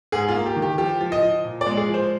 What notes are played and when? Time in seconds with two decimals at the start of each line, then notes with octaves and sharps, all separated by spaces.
0.12 G#2 G#4
0.29 F4
0.34 A#3
0.46 G4
0.56 D#3
0.62 G4
0.78 F3 G4
1.01 F3
1.12 D#5
1.22 F3
1.44 A#2
1.61 D5
1.66 G#3
1.77 G#4
1.89 F3
1.94 C5